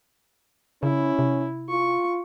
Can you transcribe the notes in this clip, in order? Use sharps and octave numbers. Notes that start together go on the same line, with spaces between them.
C#3 C#4 E4
C3
F4 C#6